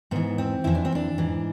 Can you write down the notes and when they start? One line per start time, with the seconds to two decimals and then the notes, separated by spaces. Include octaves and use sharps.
0.11 G#2 E3 B3
0.38 C4
0.64 F2 E3 E4
0.75 D4
0.85 C4
0.95 D4
1.18 G#2 E3